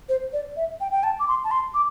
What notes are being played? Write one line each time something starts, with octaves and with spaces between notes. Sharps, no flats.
C5
D5
E5
G5
G5
A5
D6
C6
A5
C6
D6